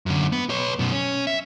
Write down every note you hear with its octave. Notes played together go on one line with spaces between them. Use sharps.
F#2 D3
B3
B4 C#5
F#2 B2
C#4
E5